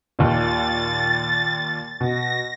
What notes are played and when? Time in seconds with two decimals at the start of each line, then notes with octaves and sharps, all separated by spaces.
0.19 D#2 A#2 A6
2.01 B2 A#6